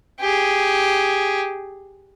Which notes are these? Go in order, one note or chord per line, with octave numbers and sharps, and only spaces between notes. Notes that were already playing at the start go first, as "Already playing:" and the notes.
G4 G#4